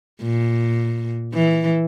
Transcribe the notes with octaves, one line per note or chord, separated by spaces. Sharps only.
A#2
E3